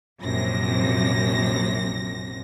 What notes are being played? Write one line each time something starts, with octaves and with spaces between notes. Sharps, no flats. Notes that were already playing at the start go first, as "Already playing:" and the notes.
A#1 F#2 C3 A#6